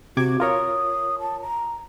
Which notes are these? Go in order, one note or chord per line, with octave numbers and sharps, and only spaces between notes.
C3 F#4 D6 G#6
F4 A#4 C#5 D#6
A5
A#5